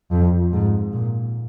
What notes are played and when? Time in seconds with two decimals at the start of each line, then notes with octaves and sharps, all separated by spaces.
0.11 F2
0.52 G#2
0.93 A#2